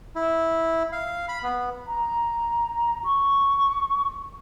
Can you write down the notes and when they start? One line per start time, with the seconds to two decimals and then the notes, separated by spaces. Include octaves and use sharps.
0.15 E4
0.92 F5
1.28 B5
1.43 B3
1.88 A#5
3.05 C#6